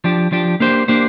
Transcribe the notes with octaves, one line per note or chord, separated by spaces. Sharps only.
F3 D4 G4
F3 D4 G4
A#3 D4 G4 C5
A#3 D4 G4 C5